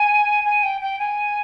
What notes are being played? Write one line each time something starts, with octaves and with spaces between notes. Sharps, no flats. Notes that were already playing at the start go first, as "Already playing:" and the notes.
Already playing: G#5
G#5
G5
G5
G#5